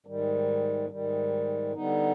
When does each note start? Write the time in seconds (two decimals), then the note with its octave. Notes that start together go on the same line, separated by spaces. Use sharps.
0.06 G#2 D#3 G3
0.89 G#2 D#3 G3
1.73 D3 G3 B3 D#4